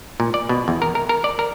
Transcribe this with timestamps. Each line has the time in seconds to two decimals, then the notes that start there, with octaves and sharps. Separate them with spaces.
0.20 A#2
0.34 D5
0.49 B2
0.68 E2
0.82 A#4
0.95 A#4
1.09 A#4
1.24 D5
1.39 A#4